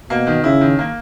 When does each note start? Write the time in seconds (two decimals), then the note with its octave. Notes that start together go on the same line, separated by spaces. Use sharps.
0.10 B2 A#3
0.27 D#3
0.44 C#3 E4
0.61 D#3
0.79 A#3